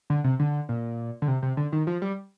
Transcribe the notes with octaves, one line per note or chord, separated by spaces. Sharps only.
D3
C3
D3
A#2
D3
C3
C3
D3
D#3
F3
G3